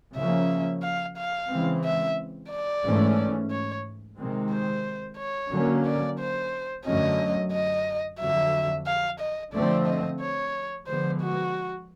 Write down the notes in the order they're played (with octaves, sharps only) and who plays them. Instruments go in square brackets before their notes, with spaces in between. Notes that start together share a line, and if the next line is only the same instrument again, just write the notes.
[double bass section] C#3 F3 A#3 C#4 [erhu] E5
[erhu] F5
F5
[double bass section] C#3 E3 G#3 C4
[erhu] E5
D5
[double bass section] G#2 E3 A3 C#4
[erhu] C#5
[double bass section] C3 D#3 G#3 C4
[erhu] C5
C#5
[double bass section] D3 F#3 A#3 C#4
[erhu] D5
C5
[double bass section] F#2 D3 F#3 A3 C#4 [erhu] D#5
[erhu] D#5
[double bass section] F2 D3 F#3 [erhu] E5
[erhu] F5
D#5
[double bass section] D3 F3 A3 C4 [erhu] D5
[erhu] D#5
C#5
[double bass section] D3 F3 G#3 B3 [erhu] C5
[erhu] F#4